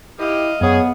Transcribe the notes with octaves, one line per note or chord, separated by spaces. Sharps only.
E4 G4 D#5 F5
F#2 B3 G#4 C#5